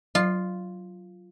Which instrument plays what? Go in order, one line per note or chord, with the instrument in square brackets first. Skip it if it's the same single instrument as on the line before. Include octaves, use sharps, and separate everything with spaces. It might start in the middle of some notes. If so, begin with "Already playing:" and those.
[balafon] F#3 [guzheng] F4